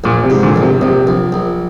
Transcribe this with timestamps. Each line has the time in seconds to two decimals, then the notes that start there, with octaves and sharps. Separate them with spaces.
0.04 A#1 A#2
0.24 C3
0.30 G#2
0.43 A#2 D3
0.56 A#1
0.62 C3
0.81 A#1 C3
1.07 A#1
1.32 A#1